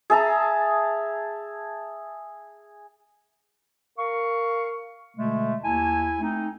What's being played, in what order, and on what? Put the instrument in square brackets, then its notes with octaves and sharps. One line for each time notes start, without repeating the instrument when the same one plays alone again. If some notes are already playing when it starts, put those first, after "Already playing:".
[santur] G#4 E5 A5 A#5
[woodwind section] A#4 F5 C#6
B2 D3 G#3 A3
D#2 A#3 E4 G#5 A5
A3 C4 D#4